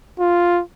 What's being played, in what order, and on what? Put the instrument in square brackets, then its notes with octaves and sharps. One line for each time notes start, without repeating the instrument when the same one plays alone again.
[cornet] F4